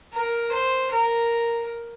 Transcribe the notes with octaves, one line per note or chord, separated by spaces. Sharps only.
A#4
C5
A#4